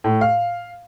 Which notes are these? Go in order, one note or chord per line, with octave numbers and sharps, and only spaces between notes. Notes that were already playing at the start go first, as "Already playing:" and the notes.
A2
F5